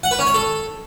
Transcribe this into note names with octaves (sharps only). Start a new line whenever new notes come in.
F#5
B4
C#4
C#5
A4